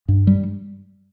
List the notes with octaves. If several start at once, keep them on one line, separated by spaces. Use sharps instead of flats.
G2
G3